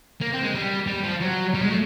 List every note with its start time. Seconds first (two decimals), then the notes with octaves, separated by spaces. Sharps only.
0.21 A#3
0.33 C4
0.43 G#3
0.55 G3
0.88 G3
1.04 F3
1.21 F#3
1.54 G3
1.62 G#3
1.70 A3